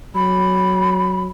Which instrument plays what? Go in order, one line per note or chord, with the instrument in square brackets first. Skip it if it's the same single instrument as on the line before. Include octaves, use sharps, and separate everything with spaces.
[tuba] F#3 [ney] B5